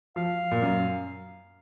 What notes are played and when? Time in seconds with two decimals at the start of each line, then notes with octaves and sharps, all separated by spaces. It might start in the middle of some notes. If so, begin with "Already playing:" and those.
0.16 F3 F5
0.51 A#2
0.62 F#2